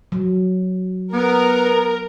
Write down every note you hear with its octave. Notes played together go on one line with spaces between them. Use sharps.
F#3
B3 A#4